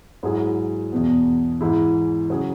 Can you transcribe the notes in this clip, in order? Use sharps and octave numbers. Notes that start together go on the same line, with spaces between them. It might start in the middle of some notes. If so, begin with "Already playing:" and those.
G#2 F#3 E4 G#4
E2 B2 B3
G#2 E3 G#3 E4
C#3 F#3 C#4 G#4